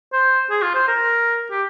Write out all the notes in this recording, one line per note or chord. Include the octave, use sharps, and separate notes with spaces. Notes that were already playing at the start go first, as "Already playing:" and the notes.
C5
G#4
F4
C5
A#4
G4